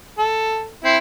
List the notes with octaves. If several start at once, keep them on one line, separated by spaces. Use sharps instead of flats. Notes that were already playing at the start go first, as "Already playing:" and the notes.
A4
C4 E4